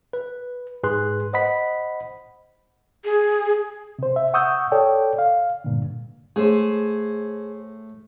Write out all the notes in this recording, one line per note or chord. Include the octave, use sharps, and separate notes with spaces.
B4
G#2 G#4 B4 C6 F#6
C5 D#5 F#5 B5 B6
G#4
C3 C5
E5
F#5 C#6 D#6 E6 G6
A4 C#5 D5 G5
F5
G2 A#2 D3
A2 G#4 C5